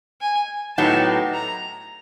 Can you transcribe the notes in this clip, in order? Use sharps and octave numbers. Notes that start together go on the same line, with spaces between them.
G#5
A2 F#3 B3 D#4 G4 A5
A#5